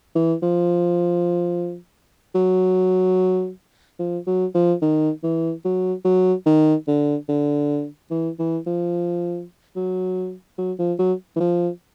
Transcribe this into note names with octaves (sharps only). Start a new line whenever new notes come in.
E3
F3
F#3
F3
F#3
F3
D#3
E3
F#3
F#3
D#3
D3
D3
E3
E3
F3
F#3
F#3
F3
F#3
E3
F3